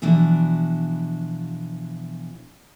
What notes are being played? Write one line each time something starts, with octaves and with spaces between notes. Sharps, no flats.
B2 E3 F3 D4 F#4